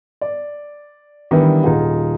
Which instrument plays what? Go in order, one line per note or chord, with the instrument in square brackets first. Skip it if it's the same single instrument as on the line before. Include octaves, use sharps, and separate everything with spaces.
[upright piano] D5
D#3 E3 G3 B3 D4 E4
D#1 D#4 F4 G#4 F#5